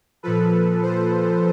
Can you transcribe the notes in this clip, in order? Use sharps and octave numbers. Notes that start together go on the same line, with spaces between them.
A#2 F3 A4 B4
C5